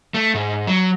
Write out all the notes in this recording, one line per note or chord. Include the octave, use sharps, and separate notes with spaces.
A3
G#2
F#3